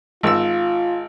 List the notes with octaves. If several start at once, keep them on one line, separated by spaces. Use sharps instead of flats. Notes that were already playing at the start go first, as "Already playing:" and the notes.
G#1 F4 E6